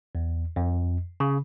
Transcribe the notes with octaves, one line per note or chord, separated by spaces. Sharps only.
E2
F2
C#3